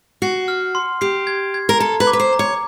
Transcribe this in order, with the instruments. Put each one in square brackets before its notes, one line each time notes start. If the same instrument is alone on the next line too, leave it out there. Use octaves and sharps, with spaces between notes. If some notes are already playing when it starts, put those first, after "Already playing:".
[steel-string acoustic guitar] F#4 [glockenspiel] C7
[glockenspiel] F6
C6
[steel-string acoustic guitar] G4 [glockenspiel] C7
[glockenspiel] G#6
G#6
[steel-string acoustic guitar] A#4
[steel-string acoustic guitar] A4 [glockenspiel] A#5
[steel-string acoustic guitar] B4
[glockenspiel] D6
[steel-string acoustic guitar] B4
C5
[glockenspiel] A#5
[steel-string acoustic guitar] C#5